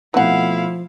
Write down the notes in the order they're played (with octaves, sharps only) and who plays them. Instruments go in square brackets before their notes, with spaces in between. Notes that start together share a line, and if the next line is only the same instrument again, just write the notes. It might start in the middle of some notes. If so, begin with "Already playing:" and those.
[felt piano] B2 A3 C4 [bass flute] F3 [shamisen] F#3 F#5 [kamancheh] E4 F5